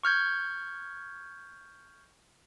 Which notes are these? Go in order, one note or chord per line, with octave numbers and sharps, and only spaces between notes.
C#6 F6 G6 G#6